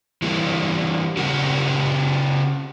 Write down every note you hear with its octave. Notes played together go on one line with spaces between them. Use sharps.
E3 G3 A#3
C#3 C#4 F#4 G4 A#4